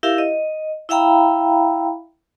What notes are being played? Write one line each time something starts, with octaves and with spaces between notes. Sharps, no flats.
E4 G4 A#4 E5 F5
D#5
E4 E5 F5 G5 A#5 B5